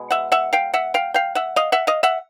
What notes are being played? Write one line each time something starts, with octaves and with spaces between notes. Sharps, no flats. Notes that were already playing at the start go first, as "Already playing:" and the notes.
Already playing: B2 G#3
E5 F#5
E5 F#5
F5 G5
E5 F#5
F5 G5
F5 G5
E5 F#5
D#5 F5
E5 F#5
D#5 F5
E5 F#5